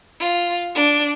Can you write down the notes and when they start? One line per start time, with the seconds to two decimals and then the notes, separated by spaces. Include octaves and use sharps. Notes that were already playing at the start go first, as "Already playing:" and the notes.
0.20 F4
0.75 D4